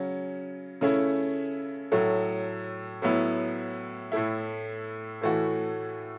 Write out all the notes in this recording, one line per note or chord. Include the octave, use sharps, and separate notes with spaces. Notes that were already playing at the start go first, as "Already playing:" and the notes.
Already playing: C#3 F#3 C#4
C#3 A3 C#4 E4
A2 F#3 A3
A2 F#3 B3 E4
A2 A3 E4
A2 E3 A3 F#4